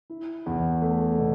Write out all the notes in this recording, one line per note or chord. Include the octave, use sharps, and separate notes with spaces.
E4
E2
A3
B2